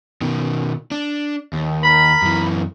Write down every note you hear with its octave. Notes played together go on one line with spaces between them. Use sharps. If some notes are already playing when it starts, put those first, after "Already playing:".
B2 D#3
D4
D#2
A#4 B5
F#2 E3